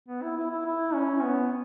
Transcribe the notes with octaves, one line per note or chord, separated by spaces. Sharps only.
B3
E4
E4
E4
E4
C#4
B3